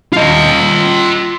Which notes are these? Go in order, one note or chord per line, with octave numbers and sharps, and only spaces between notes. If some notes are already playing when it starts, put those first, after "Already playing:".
F4 D#5